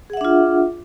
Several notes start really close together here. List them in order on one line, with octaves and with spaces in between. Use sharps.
G#4 F#5 E5 D4 F4